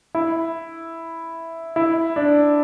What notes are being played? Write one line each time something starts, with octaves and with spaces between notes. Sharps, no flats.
E4
E4
D4